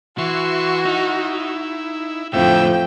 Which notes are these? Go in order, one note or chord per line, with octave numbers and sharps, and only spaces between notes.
E3 F#4 E5 C6 C#6
D#4 E4
F2 A2 D3 E4 E5 G5